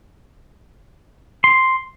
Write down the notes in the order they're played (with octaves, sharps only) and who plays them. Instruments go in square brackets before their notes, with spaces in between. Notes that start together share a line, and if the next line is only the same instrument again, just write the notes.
[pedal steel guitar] C6